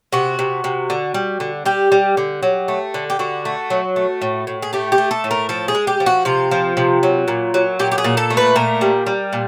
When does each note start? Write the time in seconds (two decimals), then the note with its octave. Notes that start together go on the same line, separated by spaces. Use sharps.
0.13 C3 F#4
0.39 C3
0.64 C3
0.90 D3
1.14 G3
1.40 D3
1.65 G3 G4
1.92 G3
2.17 D3
2.43 F#3
2.68 A3
2.94 D3
3.10 G4
3.19 D3 F#4
3.45 A3
3.70 F#3
3.96 A3
4.22 A2
4.47 A2
4.62 G#4
4.73 A3 G4
4.92 G4
4.98 A3
5.11 A4
5.24 A2
5.31 A#4
5.49 F3 A4
5.68 G#4
5.75 G#3
5.87 G4
6.00 F3
6.06 F#4
6.25 C3 F4
6.51 F3
6.77 C3
7.03 F#3
7.28 A#2
7.54 F#3
7.79 A#2 G4
7.92 G4
7.98 G#4
8.04 A#2
8.17 A4
8.30 A3
8.37 B4
8.56 A#2 A#4
8.81 G3
9.06 G3
9.33 A#2